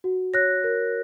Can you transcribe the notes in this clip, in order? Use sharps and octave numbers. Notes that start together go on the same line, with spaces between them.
F#4
C#5 F#6 A#6
A#4